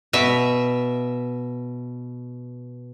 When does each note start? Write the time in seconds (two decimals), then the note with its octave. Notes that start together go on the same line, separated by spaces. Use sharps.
0.13 B2 E5